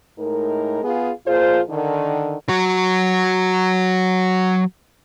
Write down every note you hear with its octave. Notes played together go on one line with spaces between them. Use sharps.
A2 G#3 D#4 A#4
B3 F4 G#4
A#2 F3 F4 G#4 C5
D3 D#3
F#3 F#4